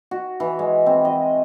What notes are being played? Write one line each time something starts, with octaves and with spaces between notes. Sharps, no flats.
F#4
E3
G#3
C4
D#5